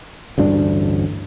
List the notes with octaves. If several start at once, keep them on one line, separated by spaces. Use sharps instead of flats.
A1 D2 G2 D4